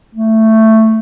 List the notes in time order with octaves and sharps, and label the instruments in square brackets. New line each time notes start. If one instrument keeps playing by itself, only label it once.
[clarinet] A3